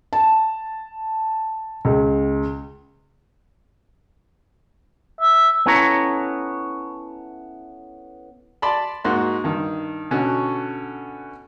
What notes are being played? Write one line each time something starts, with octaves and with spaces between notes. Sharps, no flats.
A5
C#2
E5
B3 C#4 E4 A4 C#5 A#5
D5 A5 B5 C6
G#2 A#3 F#4 C6
G2 D#3
B2 D3 C#4 F#4